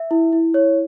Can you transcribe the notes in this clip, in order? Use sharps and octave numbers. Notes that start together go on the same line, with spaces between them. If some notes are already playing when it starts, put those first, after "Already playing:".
Already playing: E5
E4
E4
C#5